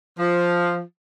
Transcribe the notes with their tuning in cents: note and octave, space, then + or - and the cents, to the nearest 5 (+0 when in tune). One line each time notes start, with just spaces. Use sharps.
F3 +0